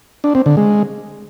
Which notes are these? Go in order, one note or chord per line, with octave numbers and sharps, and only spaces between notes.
D4
C4
D3
G#3